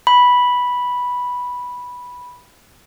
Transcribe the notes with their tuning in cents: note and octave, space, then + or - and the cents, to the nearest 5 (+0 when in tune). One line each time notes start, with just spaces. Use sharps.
B5 -5